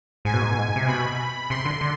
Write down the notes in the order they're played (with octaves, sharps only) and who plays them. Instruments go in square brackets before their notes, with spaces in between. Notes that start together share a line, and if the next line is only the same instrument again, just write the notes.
[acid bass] G#2 [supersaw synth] G#5
[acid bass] B2
G#2
B2
G#2
C3
[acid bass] B2 [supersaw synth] B5
[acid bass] C3 [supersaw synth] C6
[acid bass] D3
D3